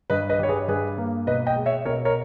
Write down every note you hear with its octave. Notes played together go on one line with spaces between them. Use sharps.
G2 B4 D#5
B4 D#5
G3 C#5
G#4 B4
G2 G#4 B4
A#3
B2 B4 D#5
D#5 G5
G#3
C#5 E5
B2 A#4 C#5
A#4 C#5